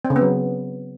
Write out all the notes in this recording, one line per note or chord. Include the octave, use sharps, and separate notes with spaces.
C4
C#3
B3
F#3